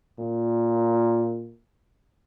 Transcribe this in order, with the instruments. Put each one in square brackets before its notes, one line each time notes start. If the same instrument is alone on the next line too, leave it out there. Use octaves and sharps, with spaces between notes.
[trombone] A#2